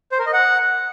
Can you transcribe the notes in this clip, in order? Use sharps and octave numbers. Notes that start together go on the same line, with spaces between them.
C5
A#4
D#5
F#5